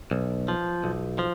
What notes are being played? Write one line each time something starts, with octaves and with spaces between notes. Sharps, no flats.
B1
F3
B1
F3